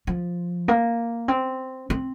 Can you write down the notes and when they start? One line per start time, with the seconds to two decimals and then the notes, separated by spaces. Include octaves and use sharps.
0.07 F3
0.68 A#3
1.28 C4
1.90 C4